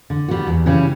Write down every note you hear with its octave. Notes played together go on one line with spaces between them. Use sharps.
D3
G3 B3 F#4
E2
C#3 E3 G3 C#4